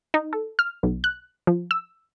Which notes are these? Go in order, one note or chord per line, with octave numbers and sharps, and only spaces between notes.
D#4
A4
F6
B1
F#6
F3
E6